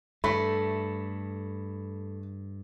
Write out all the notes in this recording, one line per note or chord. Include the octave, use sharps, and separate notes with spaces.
G2 A3 B5